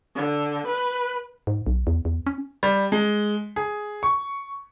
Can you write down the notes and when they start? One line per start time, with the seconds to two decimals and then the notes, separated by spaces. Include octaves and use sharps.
0.15 D3
0.64 B4
1.47 G#2
1.66 B1
1.87 E2
2.05 E2
2.27 C#4
2.63 G3
2.92 G#3
3.56 G#4
4.03 C#6